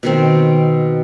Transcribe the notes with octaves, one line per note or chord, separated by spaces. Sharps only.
B2 D#3 C4